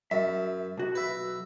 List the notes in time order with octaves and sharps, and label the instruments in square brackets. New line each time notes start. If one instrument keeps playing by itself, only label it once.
[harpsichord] F#2 [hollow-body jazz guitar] E5
[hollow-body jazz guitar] B1 F#4
[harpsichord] B4 E5